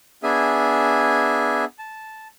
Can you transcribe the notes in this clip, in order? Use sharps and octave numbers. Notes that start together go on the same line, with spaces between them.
B3 D4 G#4 E5 G#5
A5